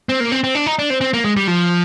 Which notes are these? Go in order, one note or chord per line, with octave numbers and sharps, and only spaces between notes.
C4
A#3
C4
C4
D4
D#4
D4
C4
C4
A#3
G#3
G3
F3